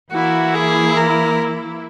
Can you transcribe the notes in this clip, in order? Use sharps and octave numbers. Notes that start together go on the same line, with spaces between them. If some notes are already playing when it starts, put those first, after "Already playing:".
E3 A#3 E4 F#4
G#4
A#4